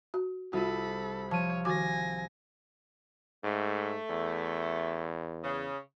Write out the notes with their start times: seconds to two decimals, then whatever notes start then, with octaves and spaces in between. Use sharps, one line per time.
0.14 F#4
0.53 C2 F4 F#4 A4 B5
1.31 F3 C#5 A5 D#7
1.65 D#3 F#4 G#5 D6 A#6
3.43 G#2 A3
4.09 E2
5.43 C#3